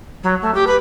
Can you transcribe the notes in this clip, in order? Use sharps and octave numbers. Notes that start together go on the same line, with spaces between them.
F#3
A3
G4
B4